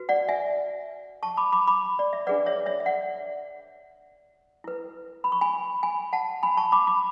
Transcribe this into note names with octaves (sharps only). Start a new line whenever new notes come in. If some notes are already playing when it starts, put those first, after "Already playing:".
Already playing: F#4 B4
D5 F#5
E5 G#5
A5 C#6
B5 D6
B5 D6
B5 D6
D5
E5
D4 G#4 B4 D5 F#5
C#5 E5
C#5 E5
E5
D5 F#5
E4 B4
B5
C#6
G#5 B5
G#5 B5
F#5 A5
G#5 B5
A5 C#6
B5 D6
B5 D6